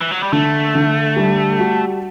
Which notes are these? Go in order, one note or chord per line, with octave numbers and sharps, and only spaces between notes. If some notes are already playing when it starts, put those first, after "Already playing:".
E3
F#3
G3
D3 A3
D3
G3
F#4